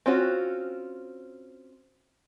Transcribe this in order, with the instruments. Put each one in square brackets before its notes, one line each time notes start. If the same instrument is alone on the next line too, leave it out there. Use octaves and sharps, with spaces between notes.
[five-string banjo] C4 C#4 F4 F#4